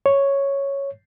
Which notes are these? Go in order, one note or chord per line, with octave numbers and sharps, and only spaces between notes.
C#5